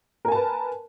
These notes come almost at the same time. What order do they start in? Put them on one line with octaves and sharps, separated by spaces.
A#4 G#5 A5 B4